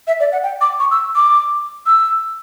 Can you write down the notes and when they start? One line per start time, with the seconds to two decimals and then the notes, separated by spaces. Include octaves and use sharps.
0.07 E5
0.20 D5
0.32 F#5
0.43 G5
0.61 D6
0.80 C#6
0.91 E6
1.16 D6
1.86 E6